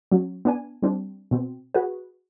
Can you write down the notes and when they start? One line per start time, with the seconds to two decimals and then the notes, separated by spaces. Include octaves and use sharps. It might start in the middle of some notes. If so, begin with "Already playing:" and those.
0.12 F#3 C#4
0.45 B3 D4 G#5
0.82 G3 C4 D4
1.31 B2 C4
1.74 F#4 G#4 B4